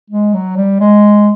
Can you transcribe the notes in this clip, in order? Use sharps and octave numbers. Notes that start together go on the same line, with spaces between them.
G#3
F#3
G3
G#3